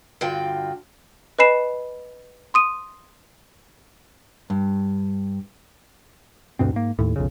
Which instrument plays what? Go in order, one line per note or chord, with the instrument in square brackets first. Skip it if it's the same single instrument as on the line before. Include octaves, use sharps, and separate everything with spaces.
[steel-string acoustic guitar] G2 D3 F4 F#4 G5
[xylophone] B4 D#5 G#5 B5 C7 E7
C6 D#6 D#7
[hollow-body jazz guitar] G2
[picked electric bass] D2 G2 B2 C4
G#2 A#3
D#2 A2
B1 F2 C#3